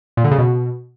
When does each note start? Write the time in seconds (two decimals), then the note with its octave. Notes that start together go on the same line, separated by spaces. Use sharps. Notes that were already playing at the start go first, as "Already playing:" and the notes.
0.17 A#2
0.24 D3
0.31 C#3
0.38 B2